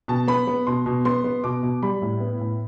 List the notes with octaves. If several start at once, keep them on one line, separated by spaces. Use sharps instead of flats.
B2 A5
B3 B5
B3
B2 C6
B2
B3 C6
B3
B2 D6
B2
G3 B5
A2
B3
A2